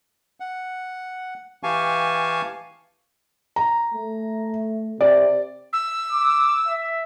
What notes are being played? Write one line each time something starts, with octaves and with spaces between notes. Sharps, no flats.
F#5
E3 G4 F5 G#5 A5 C#6
A#5
A3
C3 D5
E6
D6
E5